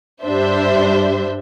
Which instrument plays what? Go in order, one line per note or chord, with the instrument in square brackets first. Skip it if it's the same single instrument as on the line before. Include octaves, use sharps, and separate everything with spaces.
[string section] G2 G3 D4 C5 E5